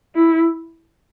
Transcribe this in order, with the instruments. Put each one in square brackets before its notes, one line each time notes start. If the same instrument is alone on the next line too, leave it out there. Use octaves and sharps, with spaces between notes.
[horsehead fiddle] E4